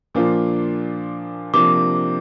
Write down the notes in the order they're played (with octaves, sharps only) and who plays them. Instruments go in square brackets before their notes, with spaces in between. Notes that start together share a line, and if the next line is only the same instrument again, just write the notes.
[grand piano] A#2 F3 A#3 D4 F4
[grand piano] C3 F3 A#3 D4 [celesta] D6